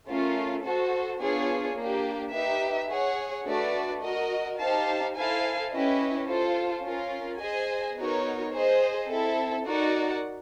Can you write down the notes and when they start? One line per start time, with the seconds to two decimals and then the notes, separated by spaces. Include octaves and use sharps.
0.08 A3 C#4 F4 A#4
0.64 F#4 A4 C5
1.20 B3 D4 F4 G#4 C#5
1.77 A#3 D4 G4
2.33 D#4 G4 B4 E5
2.89 G#4 C#5 F#5
3.46 A3 D4 F#4 B4 D5
4.02 F#4 A#4 D#5
4.58 D#4 G4 C5 F5 A5
5.15 E4 A4 C5 F5 G#5
5.72 C#4 E4 G4 B4 D#5
6.27 F4 A4 C5
6.83 C#4 F4 A#4
7.40 G#4 C5 D#5 G#5
7.97 B3 D#4 F#4 A#4 C#5
8.53 G#4 C5 D#5
9.10 C4 E4 A4
9.66 D#4 F#4 A#4 D5 F#5